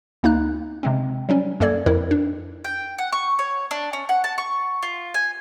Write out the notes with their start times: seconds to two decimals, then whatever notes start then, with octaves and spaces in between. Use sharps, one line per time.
0.23 D2 A#3 D#4 F#6
0.83 C3 G#3 C4
1.29 F#3 G3 C#4
1.60 F#2 A#3 A4 D5 G#6
1.86 F2 F3 E4 A#4
2.11 D4
2.65 G5
2.98 F#5
3.13 C#6
3.39 C#5
3.71 D4
3.93 C#4
4.09 F#5
4.24 A5
4.38 C#6
4.83 F4
5.14 G#5